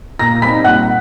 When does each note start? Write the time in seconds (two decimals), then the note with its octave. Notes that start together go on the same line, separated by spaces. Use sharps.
0.19 A#2 A#5 A#6
0.42 G3 C4 D#4 B5 B6
0.64 A#2 F#5 F#6